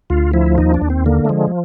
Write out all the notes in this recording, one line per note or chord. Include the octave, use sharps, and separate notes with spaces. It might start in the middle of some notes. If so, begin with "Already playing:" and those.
D2 F4
F3 E4
D#2 D#4
D4
D#2
C4
D3 A#3
A3
F3 G#3